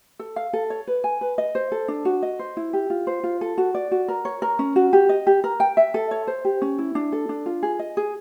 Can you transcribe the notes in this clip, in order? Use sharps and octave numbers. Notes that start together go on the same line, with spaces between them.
A4
F5
A4
C#5
B4
G#5
B4
D#5
C5
A4
D4
F#4
D#5
C5
E4
G4
F4
C5
F4
A4
F#4
D5
F#4
A#4
C#5
A#4
C#4
F#4
G4
D#5
G4
A#4
G5
E5
A4
C#5
C5
G4
C#4
E4
D4
A4
D4
F4
G#4
D#5
G#4